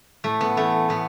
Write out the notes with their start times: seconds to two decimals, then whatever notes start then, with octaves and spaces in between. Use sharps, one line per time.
0.24 A2 A3
0.41 B3
0.57 E3 A3
0.89 A2 B3